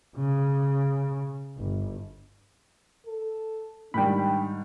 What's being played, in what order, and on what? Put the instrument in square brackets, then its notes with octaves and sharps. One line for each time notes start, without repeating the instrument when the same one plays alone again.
[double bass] C#3
G1
[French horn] A4
[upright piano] G#2 D#3 G3 [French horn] D4 [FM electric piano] G5 B5